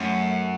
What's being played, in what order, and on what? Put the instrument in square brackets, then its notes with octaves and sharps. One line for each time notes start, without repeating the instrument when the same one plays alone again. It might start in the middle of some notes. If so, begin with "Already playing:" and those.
Already playing: [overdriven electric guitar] F#2 [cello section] A3 C#4